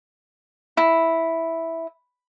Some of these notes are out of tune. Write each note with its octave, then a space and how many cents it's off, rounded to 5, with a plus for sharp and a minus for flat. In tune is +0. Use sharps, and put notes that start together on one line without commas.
E4 -5